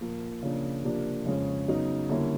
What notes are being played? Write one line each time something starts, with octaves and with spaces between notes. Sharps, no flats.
A#2 F3 A#3
C#3 F3 A#3 D4
C3 F3 A#3 D4
F2 C#3 F3 G#3 C#4
C#3 F#3 B3 D#4
D3 G3 A#3 C#4 E4